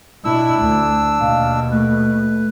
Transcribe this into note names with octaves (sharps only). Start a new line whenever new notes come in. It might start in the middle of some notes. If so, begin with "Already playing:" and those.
B2 D4 E4 E6
D2
D#2 B2 F5
A3 B4